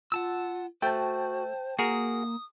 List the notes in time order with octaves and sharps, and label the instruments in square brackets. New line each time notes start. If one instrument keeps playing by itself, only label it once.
[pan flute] F4 [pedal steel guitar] F#5 A5 E6
[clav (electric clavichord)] A3 [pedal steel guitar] F#4 [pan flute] C5 [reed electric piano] G5 A5
[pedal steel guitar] A#3 [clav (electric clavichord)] F#4 G#4 A#4 [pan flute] D#6